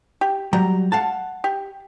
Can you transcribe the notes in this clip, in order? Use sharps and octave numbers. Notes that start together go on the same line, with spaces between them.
G4
F#3 G3 A#5
F5 F#5 A5
G4